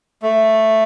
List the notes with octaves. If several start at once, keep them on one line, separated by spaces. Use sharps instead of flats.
A3